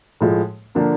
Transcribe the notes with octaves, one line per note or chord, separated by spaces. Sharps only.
A2 F3 G#3
D3 F3 A#3 D4 F4